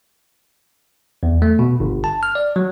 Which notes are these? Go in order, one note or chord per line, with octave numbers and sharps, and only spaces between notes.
E2
A3
B2
G1
A5
F6
D5
F#3